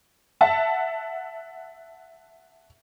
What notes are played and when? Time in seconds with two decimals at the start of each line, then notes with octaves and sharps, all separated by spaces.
0.41 E5 F#5 A5